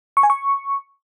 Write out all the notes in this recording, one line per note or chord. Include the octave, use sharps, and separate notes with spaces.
C#6
G#5
C#6